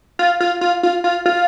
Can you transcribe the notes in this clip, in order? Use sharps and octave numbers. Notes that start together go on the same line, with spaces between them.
F4
F4
F4
F4
F4
F4